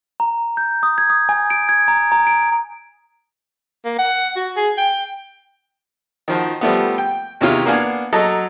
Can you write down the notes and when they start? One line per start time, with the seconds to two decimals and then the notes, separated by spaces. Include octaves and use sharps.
0.20 A#5
0.57 G6
0.83 D#6
0.98 G#6
1.10 D#6
1.29 G#5
1.50 D7
1.69 G#6
1.88 A#5
2.12 A#5
2.27 D7
3.85 A#3
3.99 F#5
4.36 F#4
4.57 G#4
4.78 G5
6.28 D#3 F3 F#4
6.61 F3 G3 A3 B3
6.98 G5
7.41 E2 C3 D#3 C#4 E4 F4
7.66 A#3 B3 D4 F5 G#5
8.13 F#3 A4 D#5 A#5